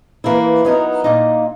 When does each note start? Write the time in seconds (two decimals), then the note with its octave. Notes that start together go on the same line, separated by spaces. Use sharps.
0.24 E3 A#3 E4
0.65 F#3 B3 D#4 A#4
1.04 A#2 A#3 D#4